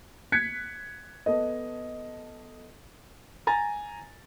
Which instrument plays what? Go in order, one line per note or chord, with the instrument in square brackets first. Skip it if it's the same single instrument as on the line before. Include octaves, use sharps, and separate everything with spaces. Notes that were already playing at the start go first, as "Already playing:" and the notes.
[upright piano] F#6 G#6 B6 C#7
B3 A4 D#5
[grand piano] G#5 A#5 A6